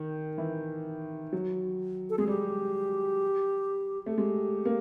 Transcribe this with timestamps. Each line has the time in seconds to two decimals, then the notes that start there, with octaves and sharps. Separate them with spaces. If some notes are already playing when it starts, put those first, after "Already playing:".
Already playing: D#3
0.38 E3
1.33 F#3
2.10 A4
2.18 G#3 G#4
2.28 G3 G4
4.06 A3
4.12 G#4
4.17 G#3 G4
4.65 A#3